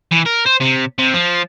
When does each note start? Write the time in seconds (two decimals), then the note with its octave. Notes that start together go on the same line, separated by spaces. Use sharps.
0.11 E3
0.25 A#4
0.46 C5
0.60 C3
0.98 C3
1.13 F3